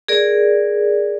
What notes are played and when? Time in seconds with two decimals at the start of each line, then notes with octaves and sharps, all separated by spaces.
0.08 G#4 A#4 D5